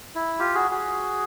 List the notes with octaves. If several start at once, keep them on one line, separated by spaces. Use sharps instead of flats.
E4
F4 G4
F#4 G#4
F#4 G#4